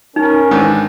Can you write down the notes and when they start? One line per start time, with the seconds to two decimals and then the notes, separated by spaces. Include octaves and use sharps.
0.16 C#4 D#4 A#4
0.51 G#2 D#3 E3 D4